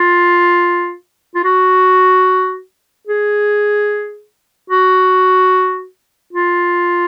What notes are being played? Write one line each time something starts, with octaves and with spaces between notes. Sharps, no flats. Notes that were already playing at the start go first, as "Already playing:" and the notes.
Already playing: F4
F4
F#4
G#4
F#4
F4